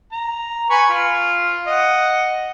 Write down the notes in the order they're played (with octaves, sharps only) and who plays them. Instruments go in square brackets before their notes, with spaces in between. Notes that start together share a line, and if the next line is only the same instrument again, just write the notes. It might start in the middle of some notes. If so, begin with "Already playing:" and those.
[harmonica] A#5
B4 G#5 C#6
F4
D#5 F#5